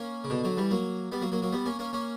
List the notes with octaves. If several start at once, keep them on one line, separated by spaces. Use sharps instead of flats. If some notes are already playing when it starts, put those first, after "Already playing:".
Already playing: A#3 C#4
C#3
B2 D3
D3 F#3
E3 G3
F#3 A#3
G3 B3
F#3 A#3
F#3 A#3
F#3 A#3
G3 B3
A#3 C#4
A#3 C#4
A#3 C#4